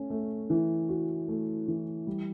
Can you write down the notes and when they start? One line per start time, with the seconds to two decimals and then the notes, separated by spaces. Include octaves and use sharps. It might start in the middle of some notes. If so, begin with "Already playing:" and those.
Already playing: A3 C#4
0.10 A3
0.50 E3
0.89 F#4
1.28 A3
1.68 E3
2.07 G3